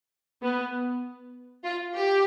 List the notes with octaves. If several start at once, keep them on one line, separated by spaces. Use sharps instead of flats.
B3
F4
G4